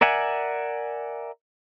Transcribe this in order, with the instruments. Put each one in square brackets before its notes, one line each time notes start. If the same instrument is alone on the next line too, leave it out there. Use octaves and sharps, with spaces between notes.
[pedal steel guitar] A#4 D5 E5 F#5 G#5